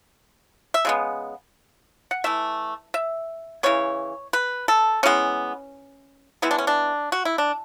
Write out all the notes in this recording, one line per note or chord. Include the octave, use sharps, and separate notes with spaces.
E5
C#3 G#3 B3
F#5
E3 A3 E5
E5
C#3 E3 B3 C#5
B4
A4
E3 G#3 B3 C#4
E3 G#3 B3 E4
D4
C#4
D4
F#4
E4
D4